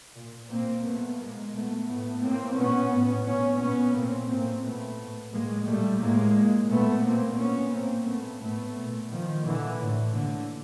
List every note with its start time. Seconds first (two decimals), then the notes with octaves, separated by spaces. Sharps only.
0.15 A#2
0.50 A#2 A#3 C4
0.85 A#2 A3 B3
1.19 A#2 G#3 A#3
1.53 A#2 A3 B3
1.88 A2 A3 B3
2.22 A2 A#3 C4
2.58 A#2 B3 C#4
2.91 A2
3.25 A#2 B3 C#4
3.60 A#2 B3 C#4
3.94 A#2 A#3 C4
4.29 A2 A#3 C4
4.63 A#2 A3 B3
4.98 A2
5.32 A2 G#3 A#3
5.67 A#2 G3 A3
6.00 A2 G#3 A#3
6.35 A#2
6.69 A#2 A3 B3
7.04 A#2 A#3 C4
7.39 A#2 B3 C#4
7.73 A2 A#3 C4
8.07 A#2 A3 B3
8.42 A2 A3 B3
8.76 A#2
9.10 A#2 D#3 F3
9.45 A#2 D3 E3
9.80 A2
10.13 A#2 D3